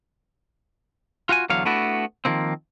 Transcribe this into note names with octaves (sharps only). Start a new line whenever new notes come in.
F4 F#4 F5 G#5
E2 D3 F#3 C#5 F5
A3 B3 D4 E4 F#4
D#3 F3 A#3 C4